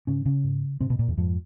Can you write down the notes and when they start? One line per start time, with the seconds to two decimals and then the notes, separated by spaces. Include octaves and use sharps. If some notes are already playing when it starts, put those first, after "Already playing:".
0.07 G#2 C#3 C#4
0.25 C#3 C#4
0.44 G#2
0.80 G#2 C3 C4
0.90 B2 B3
0.99 A#2 A#3
1.08 E2 E3
1.17 F2 G#2 F3